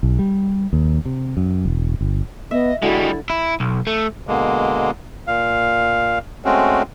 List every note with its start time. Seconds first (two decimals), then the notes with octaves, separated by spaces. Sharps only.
0.03 B1
0.19 G3
0.73 D#2
1.05 C3
1.37 F#2
1.65 E1
2.01 G1
2.51 B3 D#5 E5
2.82 D3 G3 G#3 E4 F#4
3.30 E4
3.60 B1
3.87 A3
4.27 B2 D3 G#3 A#3
5.27 A#2 F5
6.45 G#3 A3 C4 C#4 F#4